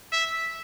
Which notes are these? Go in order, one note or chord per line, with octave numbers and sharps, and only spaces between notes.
E5